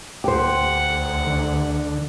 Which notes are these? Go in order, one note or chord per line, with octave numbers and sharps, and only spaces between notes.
D2 G4 C5 F#5
D3